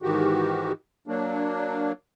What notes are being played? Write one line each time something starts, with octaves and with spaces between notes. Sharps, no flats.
G#2 D#3 E3 F#4 G4
F#3 A#3 D4